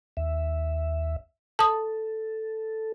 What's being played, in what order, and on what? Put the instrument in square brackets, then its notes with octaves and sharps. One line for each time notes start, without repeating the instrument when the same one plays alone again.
[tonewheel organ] D#2 E5
[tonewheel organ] A4 [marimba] A5 D#6